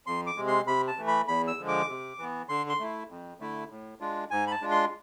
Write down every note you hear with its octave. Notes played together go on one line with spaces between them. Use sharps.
F2 C6
D6
C3 G#3
C6
C3 B5
A5
E3 A3
B5
E2 B5
E6
D3 F3 G#3
D6
C3
E3 B3
D3 C6
C6
A3 E4
F2
D3 A3 E4
A2
G#3 D4 F4
G#2 G#5
B5
A5
G#3 D4 F4
C6